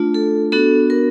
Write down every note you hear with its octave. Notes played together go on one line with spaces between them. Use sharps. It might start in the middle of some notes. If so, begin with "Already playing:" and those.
Already playing: A3 D4 F4
A4
B3 D4 F#4 A4
A#4